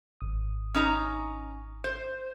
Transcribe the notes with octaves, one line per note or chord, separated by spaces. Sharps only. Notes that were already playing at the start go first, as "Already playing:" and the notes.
G#1 D#6
C#4 D#4 A#5
C5